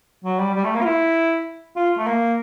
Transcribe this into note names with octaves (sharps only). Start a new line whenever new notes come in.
F#3
G3
G3
A3
A#3
F4
E4
F4
A3
A#3